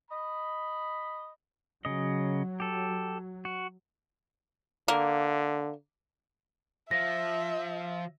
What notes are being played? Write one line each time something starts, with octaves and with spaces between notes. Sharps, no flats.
D#5 B5
C#3 F#3 D#5
G4 A4
F#4
D3 A#3
F3 E5 A#6